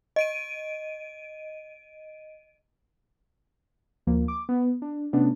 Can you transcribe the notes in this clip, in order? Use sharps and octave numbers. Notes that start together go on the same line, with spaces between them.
D#5 D7 D#7
D2 F3 A#3
D6
B3
D4
C3 A3 B3 C#4 D4